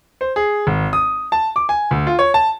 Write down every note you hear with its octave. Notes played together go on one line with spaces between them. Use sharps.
C5
G#4
G#1
D#6
A5
D6
G#5
D2
F4
C#5
A5